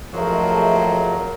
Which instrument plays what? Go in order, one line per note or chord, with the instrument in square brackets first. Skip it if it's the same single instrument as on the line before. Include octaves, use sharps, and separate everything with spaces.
[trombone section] G#1 A3 [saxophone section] F3 F#3 G#3 [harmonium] A#4